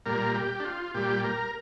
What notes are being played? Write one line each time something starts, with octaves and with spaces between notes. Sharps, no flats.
A#2 G3 A#4
G4
D4
F4
A#2 G3 G4
A#4